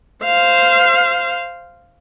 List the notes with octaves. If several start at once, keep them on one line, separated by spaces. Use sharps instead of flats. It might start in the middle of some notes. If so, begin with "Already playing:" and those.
C5 F5